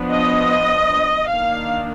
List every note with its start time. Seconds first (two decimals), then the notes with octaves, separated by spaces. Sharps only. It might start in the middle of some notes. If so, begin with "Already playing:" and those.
Already playing: F3 B3 D4
0.10 D#5
1.29 D#3 A#3 D4 F5